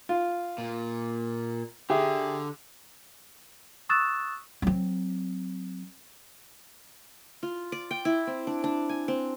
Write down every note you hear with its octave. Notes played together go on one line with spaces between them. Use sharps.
F4
A#2
D3 G4 G#4 E5
C#6 D#6 E6 F#6 A6 E7
F#3 C4
F4
D5
G5
E4
C4
D4
D4
G#5
C4